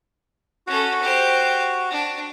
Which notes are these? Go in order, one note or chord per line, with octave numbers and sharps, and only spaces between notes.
C#4 F#4 A4
G4 C5
D4